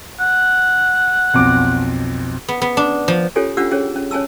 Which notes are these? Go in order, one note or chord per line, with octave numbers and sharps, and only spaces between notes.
F#5
B1 F2 D6
B3
B3
D4
F3
C#4 F4 G4 A4 C#5 G#5
C#4 D4 F4 G4 F#5 E6
C#4 G#4 C#5 G5
C#4
C#4 C#5 G#5 A5 E6